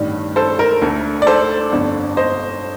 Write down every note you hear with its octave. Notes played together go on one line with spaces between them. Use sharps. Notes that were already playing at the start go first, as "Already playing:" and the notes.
Already playing: A1 G2 D#3 G3
A4 C5
A#4
D2 D3 A3
D5
A4 C5
G1 F2 D3
C5 D#5